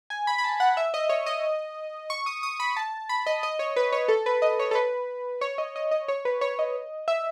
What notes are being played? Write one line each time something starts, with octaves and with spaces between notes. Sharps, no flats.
G#5
B5
B5
A5
F#5
E5
D#5
C#5
D#5
C#6
D#6
D#6
B5
A5
B5
D#5
D#5
C#5
B4
C#5
A4
B4
D#5
C#5
A4
B4
C#5
D#5
D#5
D#5
C#5
B4
C#5
D#5
E5